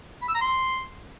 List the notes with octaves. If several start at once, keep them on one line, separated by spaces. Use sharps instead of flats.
B5
E6
A#5
C6